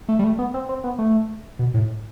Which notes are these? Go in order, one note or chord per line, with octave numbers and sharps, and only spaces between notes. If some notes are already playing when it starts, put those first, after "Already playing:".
A3
G3
A3
B3
C4
C4
B3
A3
B2
A2